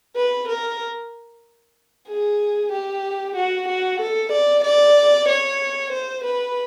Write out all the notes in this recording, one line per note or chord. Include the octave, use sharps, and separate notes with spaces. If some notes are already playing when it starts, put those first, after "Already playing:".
B4
A#4
G#4
G4
F#4
F#4
A4
D5
D5
C#5
C5
B4